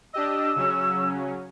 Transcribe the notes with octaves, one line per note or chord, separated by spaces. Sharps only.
D4 G4 D#5 E6
C#3 F#3 C#4